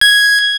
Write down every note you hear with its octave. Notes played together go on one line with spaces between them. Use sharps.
G#6